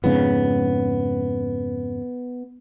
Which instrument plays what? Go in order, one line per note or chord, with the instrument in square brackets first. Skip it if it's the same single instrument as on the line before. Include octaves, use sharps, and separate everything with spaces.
[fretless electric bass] F2 G#2 C#3 [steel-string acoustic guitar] B3